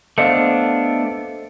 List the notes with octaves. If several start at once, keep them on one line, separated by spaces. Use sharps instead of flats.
A3 B3 D4 A4 C5 D#5 F5 C#7